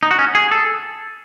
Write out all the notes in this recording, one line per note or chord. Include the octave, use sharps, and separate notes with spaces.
D#4
F#4
C#4
G#4
A4